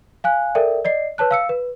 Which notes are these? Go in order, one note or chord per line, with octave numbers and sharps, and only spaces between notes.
F5 G#5 F#6
A4 A#4 D5 E5 G5
D5 D#5 C7
B4 C#5 A5 F#6
F5 E6 C#7
B4